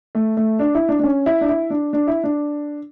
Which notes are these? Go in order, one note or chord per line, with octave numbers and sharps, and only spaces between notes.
A3
A3
D4
E4
D4
D4
C#4
E4
D4
E4
D4
D4
E4
D4